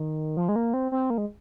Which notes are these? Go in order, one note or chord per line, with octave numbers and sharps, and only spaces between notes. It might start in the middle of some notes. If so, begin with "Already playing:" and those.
Already playing: D#3
F3
G#3
A#3
C4
C4
A#3
G#3